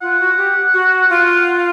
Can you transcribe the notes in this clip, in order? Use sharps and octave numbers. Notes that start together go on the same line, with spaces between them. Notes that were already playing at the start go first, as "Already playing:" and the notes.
F4 F#5
F#4
G4
F#4
F4
F#5